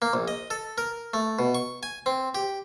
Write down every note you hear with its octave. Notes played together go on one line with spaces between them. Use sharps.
A#3
A#1
D#5
A4
A#4
A3
B2
C#6
G#5
C4
G4